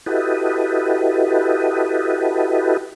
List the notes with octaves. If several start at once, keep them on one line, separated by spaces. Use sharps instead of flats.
E4 F#4 G4 A4 B4 D#5